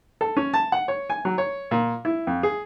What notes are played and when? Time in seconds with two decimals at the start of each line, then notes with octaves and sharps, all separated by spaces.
0.21 A4
0.37 C#4
0.54 A5
0.72 F#5
0.88 C#5
1.10 G#5
1.25 F#3
1.38 C#5
1.71 A#2
2.05 E4
2.27 F2
2.43 G#4